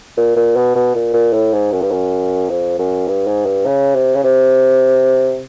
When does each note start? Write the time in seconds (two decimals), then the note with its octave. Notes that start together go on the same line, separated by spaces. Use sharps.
0.17 A#2
0.36 A#2
0.56 B2
0.75 B2
0.95 A#2
1.14 A#2
1.33 A2
1.53 G#2
1.72 F#2
1.82 G2
1.91 F#2
2.49 F2
2.79 F#2
3.08 G2
3.27 G#2
3.46 G2
3.66 C#3
3.95 C3
4.15 C#3
4.24 C3